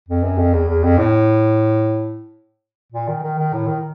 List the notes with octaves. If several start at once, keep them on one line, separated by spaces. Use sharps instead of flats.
F2
F#2
F2
E2
E2
F2
A2
A#2
D#3
D#3
D#3
A2
D#3